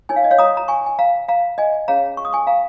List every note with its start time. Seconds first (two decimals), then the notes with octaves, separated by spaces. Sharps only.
0.09 D#4 A#4 C#5 G#5
0.16 F5
0.24 D#5
0.31 C#5 F5
0.39 A#5 D#6
0.57 A#5
0.68 G#5 C#6
0.86 G#5
0.99 F5 A#5
1.28 F5 A#5
1.58 D#5 G#5
1.88 C#4 G#4 C#5 F5 A#5
2.17 C#6
2.25 D#6
2.33 G#5 C#6
2.47 F5 A#5